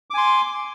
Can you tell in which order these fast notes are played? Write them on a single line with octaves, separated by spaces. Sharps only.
D6 G#5 C6